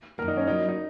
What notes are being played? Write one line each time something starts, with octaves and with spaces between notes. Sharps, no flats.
F#2 D#3 A#3 A#4
D#4
C#4
F#3 A#3 D#4 E4
D#4